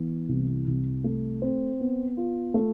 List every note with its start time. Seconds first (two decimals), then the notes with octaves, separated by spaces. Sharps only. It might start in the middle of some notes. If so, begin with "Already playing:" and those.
Already playing: E3 B3
0.29 C2
0.67 C2
1.04 A3
1.42 C4
1.80 B3
2.17 F4
2.54 A3